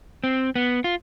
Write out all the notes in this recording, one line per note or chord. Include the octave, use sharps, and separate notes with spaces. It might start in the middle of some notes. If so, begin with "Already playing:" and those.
C4
B3
F4